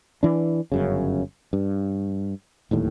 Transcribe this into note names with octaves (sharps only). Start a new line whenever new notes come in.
E3 D4
G1 F#2 C#3
G2
D1 D#2 A2